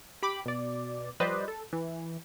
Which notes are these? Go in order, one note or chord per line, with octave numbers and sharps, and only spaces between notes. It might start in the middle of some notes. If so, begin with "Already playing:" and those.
G4 B5 D6
B2 D5
F3 G3 B4 C5 D5 D#5
A4
E3